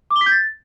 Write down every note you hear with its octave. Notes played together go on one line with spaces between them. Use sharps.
D6
G7
B6
G6
A6